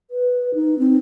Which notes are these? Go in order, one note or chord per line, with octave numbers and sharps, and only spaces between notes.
B4
D#4
C4